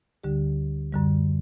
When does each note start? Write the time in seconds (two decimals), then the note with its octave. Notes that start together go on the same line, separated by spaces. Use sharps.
0.24 D2 D3 G3 G4
0.93 F#2 D3 G3